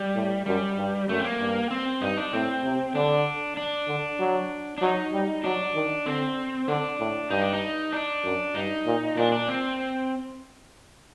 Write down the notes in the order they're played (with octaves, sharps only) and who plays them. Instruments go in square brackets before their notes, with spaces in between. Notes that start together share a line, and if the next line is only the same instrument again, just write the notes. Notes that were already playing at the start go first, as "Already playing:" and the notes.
Already playing: [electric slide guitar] G3
[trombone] A2
[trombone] F#2 [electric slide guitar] G3
[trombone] G2
[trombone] F#2 [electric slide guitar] A3
[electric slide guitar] C4
A#3
[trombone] G2
[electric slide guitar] C4
[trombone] G2 [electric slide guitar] D#4
[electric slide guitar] D4
[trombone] A2 [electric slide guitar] C4
[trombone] C3
[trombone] D3 [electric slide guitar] D4
[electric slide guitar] D4
[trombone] D3
F#3
[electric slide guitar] D4
[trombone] F#3 [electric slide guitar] D#4
[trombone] G3
[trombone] F#3 [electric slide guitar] D4
[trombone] D#3
[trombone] D3 [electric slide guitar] C4
[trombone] D3 [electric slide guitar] D4
[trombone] A2
[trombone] G2 [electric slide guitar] D#4
[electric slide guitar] D4
D#4
D4
[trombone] F#2
[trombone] G2 [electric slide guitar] D#4
[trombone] A#2
[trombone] A#2 [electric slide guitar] D4
[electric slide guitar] D4
C4